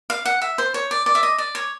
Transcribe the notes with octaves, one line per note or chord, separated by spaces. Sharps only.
F5
F#5
E5
C5
C#5
D5
D5
E5
D#5
D5
C#5